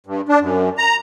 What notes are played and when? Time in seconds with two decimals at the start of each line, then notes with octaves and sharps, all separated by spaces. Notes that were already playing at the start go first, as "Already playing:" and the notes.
0.07 G2
0.29 D4
0.41 F#2
0.78 A#5